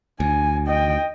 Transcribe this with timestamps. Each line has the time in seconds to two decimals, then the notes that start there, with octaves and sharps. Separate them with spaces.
0.20 D2 G#5
0.67 D#5 G5